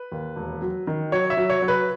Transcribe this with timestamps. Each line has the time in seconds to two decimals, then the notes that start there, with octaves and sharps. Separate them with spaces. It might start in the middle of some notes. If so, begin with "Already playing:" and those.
Already playing: B4
0.12 D#2
0.36 E1
0.62 F#3
0.87 D#3
1.12 F#3 C#5
1.30 E5
1.37 F#3
1.50 C#5
1.62 F#3
1.68 B4